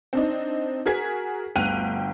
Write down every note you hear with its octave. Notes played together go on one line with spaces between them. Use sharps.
C4 D4 D#4
F#4 G#4 A#4 G#6 B6
G1 D2 G5 F#6 D#7 F7